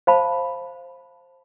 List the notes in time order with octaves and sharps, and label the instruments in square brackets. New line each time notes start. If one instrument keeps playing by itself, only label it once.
[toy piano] C5 F5 A5 B5